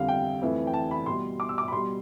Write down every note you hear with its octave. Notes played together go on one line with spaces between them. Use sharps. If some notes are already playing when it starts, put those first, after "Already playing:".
Already playing: F2 D3 G3 F5
G5
F2 E3 A3
G5
A5
B5
B2 G3 C6
D6
E6
D6
B5
B2 G3 C6